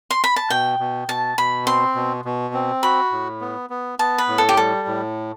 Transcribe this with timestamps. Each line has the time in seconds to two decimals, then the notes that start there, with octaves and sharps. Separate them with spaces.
0.11 C6
0.24 B5
0.36 A5
0.50 B2 G5
0.79 B2
1.08 B2 A5
1.38 B2 B5
1.66 C4 C6
1.95 B2
2.25 B2
2.54 C4
2.83 F#4 B5
3.12 A2
3.41 B3
3.70 B3
3.99 B3 A5
4.18 B4
4.28 A2
4.38 A4
4.49 G4
4.57 G3 A4
4.87 A2